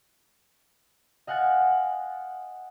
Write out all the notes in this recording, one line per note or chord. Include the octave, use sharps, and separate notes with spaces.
D#5 F5 F#5 G#5 F#6 A6